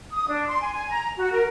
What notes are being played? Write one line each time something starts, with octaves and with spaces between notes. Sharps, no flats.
D#6
D4
C6
G#5
G#5
A#5
F#4
A#4